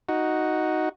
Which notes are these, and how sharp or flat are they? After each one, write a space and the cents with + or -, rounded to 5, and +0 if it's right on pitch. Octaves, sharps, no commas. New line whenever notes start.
D#4 +0 F#4 +0